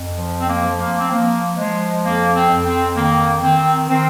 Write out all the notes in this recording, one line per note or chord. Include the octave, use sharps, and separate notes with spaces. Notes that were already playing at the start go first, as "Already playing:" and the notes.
Already playing: F2
F3
C4
A#3
F3
A#3
C4
F3 A#3
F3 G#3
F2 A#3
C4
F2
C4
D#3 A#3
D#3 C4
D#3 C4